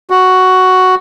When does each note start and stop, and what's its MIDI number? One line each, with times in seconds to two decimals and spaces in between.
0.10 0.95 66